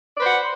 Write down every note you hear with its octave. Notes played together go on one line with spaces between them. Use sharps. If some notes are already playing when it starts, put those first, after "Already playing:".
B4 C5 D5 F#5